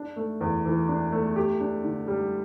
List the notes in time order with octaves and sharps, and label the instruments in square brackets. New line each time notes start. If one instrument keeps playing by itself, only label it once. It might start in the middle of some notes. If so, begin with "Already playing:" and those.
Already playing: [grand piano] D4
A3
E2
E3
D4
A3
G4
D4
D3
G3